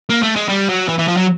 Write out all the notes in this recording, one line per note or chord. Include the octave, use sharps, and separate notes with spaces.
A#3
A3
G#3
G3
F#3
E3
E3
F3
F#3